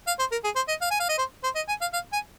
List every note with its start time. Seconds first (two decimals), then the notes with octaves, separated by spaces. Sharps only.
0.07 F5
0.19 C5
0.32 A#4
0.44 G#4
0.56 C5
0.68 D#5
0.82 F5
0.91 G#5
1.00 F5
1.09 D#5
1.18 C5
1.44 C5
1.55 D#5
1.68 G#5
1.81 F5
1.93 F5
2.13 G#5